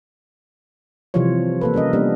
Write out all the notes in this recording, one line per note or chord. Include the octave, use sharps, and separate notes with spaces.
C3 E3 F3 G3 F4 C#5
A#3 A4 B4
G3 C#4 A#4 D#5
G3 A#3 B3 D4